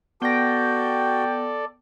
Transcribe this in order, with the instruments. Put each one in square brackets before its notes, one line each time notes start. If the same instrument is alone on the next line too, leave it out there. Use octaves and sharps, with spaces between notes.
[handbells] B3 A#6 [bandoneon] F#4 [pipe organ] A4 D5 [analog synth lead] G5